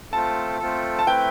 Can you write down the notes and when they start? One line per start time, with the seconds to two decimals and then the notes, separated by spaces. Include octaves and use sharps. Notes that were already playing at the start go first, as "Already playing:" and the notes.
0.12 A3 C4 F4 A4 A5
0.59 A3 C4 F4 A4
0.99 A5
1.06 A3 C4 E4 B4 G5